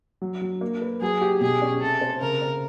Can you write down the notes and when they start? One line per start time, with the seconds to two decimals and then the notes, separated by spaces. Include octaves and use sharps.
0.22 F#3
0.42 F#3
0.61 A#3
0.82 B4
1.01 F#3 G#4
1.21 G4
1.41 B2 G#4
1.62 C#4
1.81 C3 A4
2.01 C4
2.21 C#3 A#4
2.42 C4